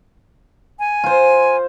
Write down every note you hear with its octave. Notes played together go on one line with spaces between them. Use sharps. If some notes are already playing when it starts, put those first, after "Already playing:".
G#5
F4 C5